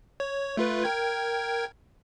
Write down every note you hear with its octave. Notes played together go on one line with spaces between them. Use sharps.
C#5
A3 F4 B4
A#4 G5 G#6